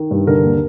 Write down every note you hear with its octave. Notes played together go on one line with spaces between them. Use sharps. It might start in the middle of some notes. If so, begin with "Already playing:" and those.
Already playing: D#3
G2
D3 A#4
D#2